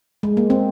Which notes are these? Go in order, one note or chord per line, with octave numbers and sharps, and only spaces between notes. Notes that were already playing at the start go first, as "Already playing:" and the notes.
G#3
A#3
C4